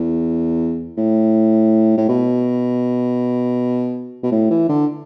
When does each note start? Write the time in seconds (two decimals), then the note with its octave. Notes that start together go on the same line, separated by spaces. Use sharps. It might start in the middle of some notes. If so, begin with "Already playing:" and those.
Already playing: E2
0.98 A2
1.97 A2
2.09 B2
4.23 B2
4.31 A2
4.50 E3
4.69 D3